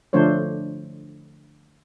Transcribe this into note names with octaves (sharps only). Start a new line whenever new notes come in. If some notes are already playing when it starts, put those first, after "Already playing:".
D3 F3 A3 D4 C5 C#5